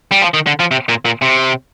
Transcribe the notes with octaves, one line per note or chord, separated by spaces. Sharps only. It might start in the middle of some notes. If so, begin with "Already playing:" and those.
G3
F3
D#3
D3
F3
C3
A#2
A#2
C3